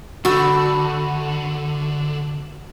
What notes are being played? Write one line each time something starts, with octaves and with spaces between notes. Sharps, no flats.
D3 A3 F#4 B5 E6